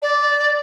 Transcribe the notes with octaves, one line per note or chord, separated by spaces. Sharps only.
D5